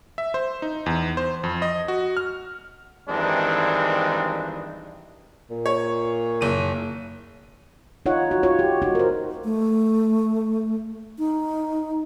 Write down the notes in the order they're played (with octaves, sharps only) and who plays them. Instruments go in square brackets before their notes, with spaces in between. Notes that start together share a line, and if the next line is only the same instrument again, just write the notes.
[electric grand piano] E5
C5
D#4
E2
C5
F2
D#5
F#4
F6
[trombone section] G2 D#3 E3 G#3 C4 D4
[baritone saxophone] A#2
[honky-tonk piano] C#5
F#1 D#7
[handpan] D#4 F4 C#5 F#5
F#4
F4 C#5
G4
D#4 F#4
A#4 C5
[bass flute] A3
D#4